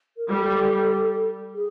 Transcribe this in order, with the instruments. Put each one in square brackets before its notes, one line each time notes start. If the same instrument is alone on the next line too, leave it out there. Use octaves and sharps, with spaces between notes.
[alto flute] A#4
[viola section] G3 [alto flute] A4
[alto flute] G#4